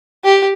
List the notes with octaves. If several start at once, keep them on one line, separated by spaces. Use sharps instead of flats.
G4